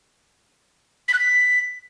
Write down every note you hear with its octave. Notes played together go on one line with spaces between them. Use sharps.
B6
F#6
B6